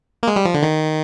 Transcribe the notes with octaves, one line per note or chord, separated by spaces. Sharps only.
A#3
G#3
G3
F3
D3
D#3